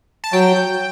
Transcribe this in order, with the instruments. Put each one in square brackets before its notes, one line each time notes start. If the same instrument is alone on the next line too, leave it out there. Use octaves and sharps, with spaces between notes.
[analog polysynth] A5
[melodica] F#3 [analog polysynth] G5